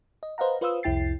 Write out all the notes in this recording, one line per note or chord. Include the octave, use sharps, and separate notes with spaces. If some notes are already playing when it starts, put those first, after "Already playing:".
D#5
B4 C5 D#5 F5 F#5 A#5
F4 B4 C5 F5 D#6 E6
C2 F2 E4 G5 A6 C7